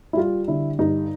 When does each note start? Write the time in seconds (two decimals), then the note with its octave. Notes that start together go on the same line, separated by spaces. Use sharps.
0.13 E4
0.17 G3 F4
0.48 D3 E4
0.79 G2 D#4